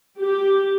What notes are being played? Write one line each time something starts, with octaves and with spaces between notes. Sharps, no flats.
G4